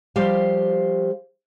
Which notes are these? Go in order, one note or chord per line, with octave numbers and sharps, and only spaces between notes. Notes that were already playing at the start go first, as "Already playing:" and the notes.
F3 G3 G4 C5 F5